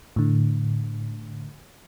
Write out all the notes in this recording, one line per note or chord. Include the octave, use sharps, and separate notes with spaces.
A2 D3